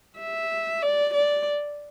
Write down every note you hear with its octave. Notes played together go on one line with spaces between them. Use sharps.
E5
D5
D5